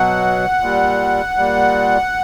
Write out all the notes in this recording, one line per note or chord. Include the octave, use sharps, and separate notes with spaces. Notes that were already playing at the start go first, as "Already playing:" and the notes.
Already playing: B2 F#3 F#5
A#2 G3
A#2 G3